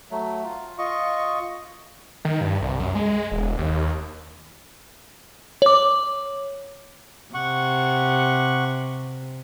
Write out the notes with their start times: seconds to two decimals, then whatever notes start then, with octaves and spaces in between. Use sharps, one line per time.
0.11 F#3 A3
0.44 F4
0.78 F4 D#5 C#6
2.25 D#3
2.41 G2
2.62 C2
2.80 F#2
2.95 G#3
3.32 E1
3.58 D#2
5.62 C#5 D6
7.34 C3 F#5 C#6